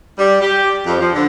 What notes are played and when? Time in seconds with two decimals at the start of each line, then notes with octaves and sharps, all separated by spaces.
0.19 G3
0.42 G4
0.86 F2
1.00 F3
1.13 D3